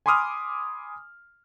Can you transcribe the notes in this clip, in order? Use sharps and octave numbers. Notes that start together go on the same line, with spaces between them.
G#5 B5 C6 D6 D#6 F6